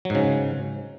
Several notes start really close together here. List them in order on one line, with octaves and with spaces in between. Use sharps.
F#3 G#2 C#3